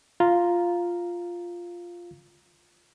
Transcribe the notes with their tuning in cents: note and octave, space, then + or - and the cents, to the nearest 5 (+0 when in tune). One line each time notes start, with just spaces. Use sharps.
F4 +0 F5 +0 A#5 +0